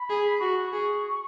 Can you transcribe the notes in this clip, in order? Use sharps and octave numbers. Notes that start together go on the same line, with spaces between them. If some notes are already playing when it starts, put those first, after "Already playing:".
Already playing: B5
G#4
F#4 C#6
G#4